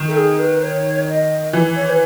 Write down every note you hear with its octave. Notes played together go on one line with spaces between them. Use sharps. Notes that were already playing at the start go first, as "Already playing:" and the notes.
Already playing: D#3
A4
G#4
B4
C#5
D#5
E3
C#5
B4